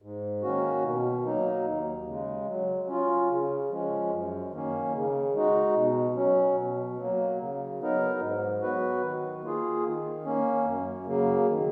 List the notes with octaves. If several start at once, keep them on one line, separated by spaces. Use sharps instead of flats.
G#2
D#3 A#3 C#4 F#4
B2
F#3 A#3 D#4
D#2
C#3 G#3
F#3
C#4 F4
C#3
F3 G#3 C#4
F#2
D#3 A#3 C#4
C#3
G#3 D#4 F#4
B2
F#3 C#4
B2
F#3 A#3
C#3
F#3 B3 D#4 A#4
G#2
F#3 B3 F#4 B4
D#3
A#3 F4 G#4
D#3
A#3 C#4
F#2
C#3 F#3 A#3
D#3